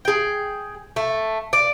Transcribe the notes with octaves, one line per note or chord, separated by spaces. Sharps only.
G#4 G5
A3
D5